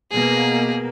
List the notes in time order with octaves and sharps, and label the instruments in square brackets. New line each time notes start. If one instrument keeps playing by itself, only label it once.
[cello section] B2 A#3 [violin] G#4